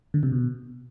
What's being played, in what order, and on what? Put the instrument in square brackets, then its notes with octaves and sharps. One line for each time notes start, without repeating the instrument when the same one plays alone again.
[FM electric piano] D3
C3
B2